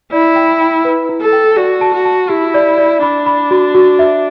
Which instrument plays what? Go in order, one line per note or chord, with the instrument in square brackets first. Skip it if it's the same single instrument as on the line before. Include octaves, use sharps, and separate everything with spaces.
[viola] E4 [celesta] D5
[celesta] G5
G5
B4
E4
[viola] A4
[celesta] G5
[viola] F#4 [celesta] D5
[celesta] A5
[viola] F#4
[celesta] A5
[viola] E4 [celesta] G4
[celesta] D5
D5
[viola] D4 [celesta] B5
[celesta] B5
F#4
F#4
E5